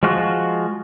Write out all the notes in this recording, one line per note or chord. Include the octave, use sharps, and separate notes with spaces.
F3 G#3 F4 F#4